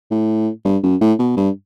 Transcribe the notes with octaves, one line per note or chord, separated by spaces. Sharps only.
A2
G2
F#2
A2
B2
G2